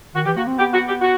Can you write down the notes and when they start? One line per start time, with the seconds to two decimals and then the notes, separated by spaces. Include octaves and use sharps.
0.15 D#3 F#4
0.26 E3 G4
0.36 A#3 F#4
0.47 C4
0.58 B3 G4
0.73 F#4
0.88 G4
1.02 F#4